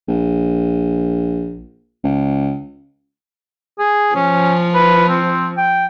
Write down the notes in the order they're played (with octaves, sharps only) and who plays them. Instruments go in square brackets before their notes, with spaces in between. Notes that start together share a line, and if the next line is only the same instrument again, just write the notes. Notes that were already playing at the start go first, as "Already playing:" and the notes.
[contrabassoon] A#1
C#2
[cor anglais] G#4
[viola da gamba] F3 [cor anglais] C#4
[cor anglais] B4
C4
G5